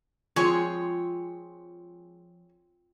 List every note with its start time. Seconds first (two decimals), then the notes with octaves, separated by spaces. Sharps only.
0.36 F3 G#3 C4 C#5 G#5